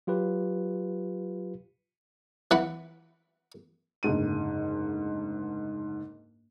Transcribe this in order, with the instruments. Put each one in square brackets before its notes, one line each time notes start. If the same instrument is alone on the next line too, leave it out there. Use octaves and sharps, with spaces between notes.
[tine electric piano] F#3 F4 G4 B4
[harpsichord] E3 B4 F#5
[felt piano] F#1 D2 G#2 D#7